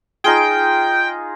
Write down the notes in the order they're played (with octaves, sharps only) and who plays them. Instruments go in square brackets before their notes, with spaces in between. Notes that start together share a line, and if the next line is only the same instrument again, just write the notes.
[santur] D#4 F4 G#4 [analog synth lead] G5